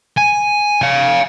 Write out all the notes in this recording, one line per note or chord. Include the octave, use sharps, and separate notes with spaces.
G#5
F5 G#5